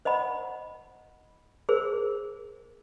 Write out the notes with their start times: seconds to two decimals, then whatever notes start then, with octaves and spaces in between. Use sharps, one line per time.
0.05 C5 D#5 F#5 B5
1.69 G#4 A#4 C5